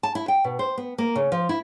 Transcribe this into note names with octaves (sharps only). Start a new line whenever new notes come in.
A5
E4
G5
B2
C5
B3
A#3
C#3
F3
E4